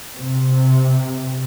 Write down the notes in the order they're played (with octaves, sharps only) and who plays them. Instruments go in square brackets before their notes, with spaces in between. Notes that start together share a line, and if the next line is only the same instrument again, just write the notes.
[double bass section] C3